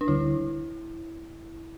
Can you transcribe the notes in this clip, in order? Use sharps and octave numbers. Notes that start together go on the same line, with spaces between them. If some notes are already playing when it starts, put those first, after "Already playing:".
D4
D2 D3 G3 E4